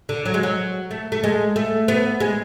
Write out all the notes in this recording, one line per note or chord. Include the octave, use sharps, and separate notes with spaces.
D3
F#3
G#3
F#3
A3
A3
G#3
A3
B3
G#3